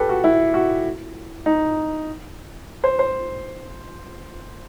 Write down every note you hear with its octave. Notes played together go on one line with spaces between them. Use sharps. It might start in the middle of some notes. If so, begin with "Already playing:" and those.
Already playing: G4 A4 B4
F#4
E4
F#4
D#4
C5
C5